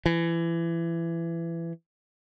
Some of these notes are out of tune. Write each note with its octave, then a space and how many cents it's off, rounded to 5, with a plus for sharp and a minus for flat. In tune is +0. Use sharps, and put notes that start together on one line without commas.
E3 +25